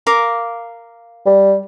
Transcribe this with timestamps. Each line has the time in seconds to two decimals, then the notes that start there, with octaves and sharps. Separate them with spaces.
0.07 A#4 F5 D6
1.26 G3